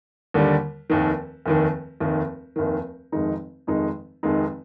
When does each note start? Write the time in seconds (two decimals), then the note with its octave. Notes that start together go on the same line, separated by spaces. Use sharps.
0.34 D#2 D3 G3
0.90 F1 D#2 D#3
1.46 F1 D#2 D#3
2.00 F1 D#2 D#3
2.56 F1 D#2 D#3
3.12 F1 F2 D#3 G#3 D#4
3.67 F1 F2 D#3 G#3 D#4
4.23 F1 F2 D#3 G#3 D#4